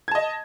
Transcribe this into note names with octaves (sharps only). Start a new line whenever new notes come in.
D#5 A5 G#6